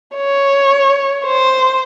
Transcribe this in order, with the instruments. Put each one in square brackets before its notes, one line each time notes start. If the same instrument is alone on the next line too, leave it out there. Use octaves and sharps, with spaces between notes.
[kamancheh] C#5
C5